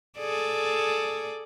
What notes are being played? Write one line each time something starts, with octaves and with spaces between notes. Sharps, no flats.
G#4 A4 D5